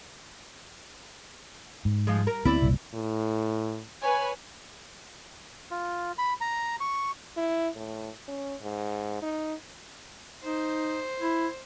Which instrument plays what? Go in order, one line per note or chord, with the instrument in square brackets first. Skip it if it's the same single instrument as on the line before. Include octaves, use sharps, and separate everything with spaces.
[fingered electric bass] G#2
[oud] F3 G#3
A#4
[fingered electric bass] D2 B3 C4 [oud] E4 D5
[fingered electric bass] F#1 C2 A#2
[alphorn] A2
[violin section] B4 C#5 G#5
[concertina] F4
B5
A#5
C#6
[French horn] E4
A2
C#4
G#2
D#4
[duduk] D#4 [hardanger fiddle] C5
[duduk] E4